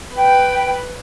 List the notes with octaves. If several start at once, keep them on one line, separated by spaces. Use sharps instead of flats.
B4 G5